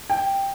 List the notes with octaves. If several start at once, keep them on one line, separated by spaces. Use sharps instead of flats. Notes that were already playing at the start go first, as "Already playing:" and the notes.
G5